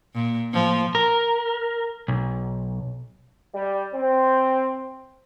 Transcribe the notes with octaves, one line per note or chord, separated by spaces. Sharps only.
A#2
A2 F3 A#3
A#4
B1
G3
C4